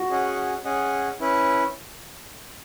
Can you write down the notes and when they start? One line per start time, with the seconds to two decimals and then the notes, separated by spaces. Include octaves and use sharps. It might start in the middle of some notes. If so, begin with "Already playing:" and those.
Already playing: F#4
0.10 C#4 G#4 D#5 F#5
0.65 C#4 G#4 D#5 F#5
1.20 C#4 E4 B4